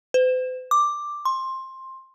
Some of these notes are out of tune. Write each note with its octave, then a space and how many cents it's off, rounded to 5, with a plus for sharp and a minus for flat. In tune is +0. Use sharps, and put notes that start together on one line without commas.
C5 -45
D6 +5
C6 +15